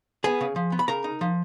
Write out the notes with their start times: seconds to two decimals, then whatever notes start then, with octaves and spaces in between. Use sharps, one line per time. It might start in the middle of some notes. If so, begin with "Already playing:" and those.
0.24 B3 G#4 G#5
0.41 C#3
0.56 F3
0.72 B3
0.79 B5
0.88 C#3 A#4 A#5
1.04 D#4
1.21 F3